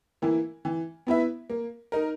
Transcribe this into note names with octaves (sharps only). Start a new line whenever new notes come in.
E3 A#3 E4
E3
B3 E4 B4 E5
A#3
D#4 A#4